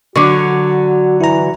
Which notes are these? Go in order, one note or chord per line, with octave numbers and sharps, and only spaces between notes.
D3 F#3 F#4 C#6 D6
E3 E4 A#5